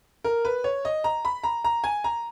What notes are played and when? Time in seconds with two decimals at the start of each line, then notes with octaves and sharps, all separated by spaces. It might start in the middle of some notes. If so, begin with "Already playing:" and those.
0.24 A#4
0.45 B4
0.64 C#5
0.85 D#5
1.04 A#5
1.25 B5
1.44 A#5
1.64 A#5
1.84 G#5
2.04 A#5